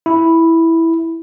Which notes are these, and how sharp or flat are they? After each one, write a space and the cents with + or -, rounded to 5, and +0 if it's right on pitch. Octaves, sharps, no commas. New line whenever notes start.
E4 -5